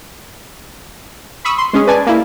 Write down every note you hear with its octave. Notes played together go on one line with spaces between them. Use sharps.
B5 C#6 D#6 E6
C6
G#3 C#4 G#4
B4 D5 G#5 A5
A#3 E4